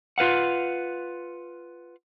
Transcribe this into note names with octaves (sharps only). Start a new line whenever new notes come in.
F4 B4 F5 F#5